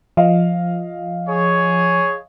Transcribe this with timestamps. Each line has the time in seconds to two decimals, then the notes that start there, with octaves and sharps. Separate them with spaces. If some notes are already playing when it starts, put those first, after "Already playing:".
0.17 F3 D#5 F5
1.29 G#4 C#5